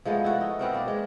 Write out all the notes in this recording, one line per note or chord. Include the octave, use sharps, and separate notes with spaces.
F3 G#3 A3 B3
E4 F#4
D#4
B2 B3 C4 A#4
A#3 D4
G#3